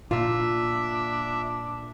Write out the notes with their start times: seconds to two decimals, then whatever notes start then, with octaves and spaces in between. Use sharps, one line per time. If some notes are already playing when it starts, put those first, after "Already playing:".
0.11 A#2 A#3 D4 F4 E5